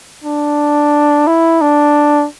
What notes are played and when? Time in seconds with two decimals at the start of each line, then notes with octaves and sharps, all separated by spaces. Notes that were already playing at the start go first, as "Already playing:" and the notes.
0.24 D4
1.27 E4
1.61 D4